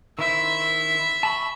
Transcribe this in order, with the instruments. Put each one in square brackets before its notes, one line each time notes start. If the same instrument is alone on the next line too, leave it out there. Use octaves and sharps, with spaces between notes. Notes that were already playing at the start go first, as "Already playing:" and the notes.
[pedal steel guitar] D#3 E4 C5 [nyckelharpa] E5
[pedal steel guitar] A5 B5 C#6